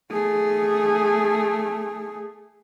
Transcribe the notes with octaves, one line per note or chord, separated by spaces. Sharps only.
A3 G#4